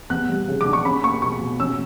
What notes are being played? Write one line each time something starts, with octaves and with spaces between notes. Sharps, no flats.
B3 F#6
G3
C#3
D6
D4
C#6
C#4 B5
A#3 C#6
B2 C#6
B2
C#4 E6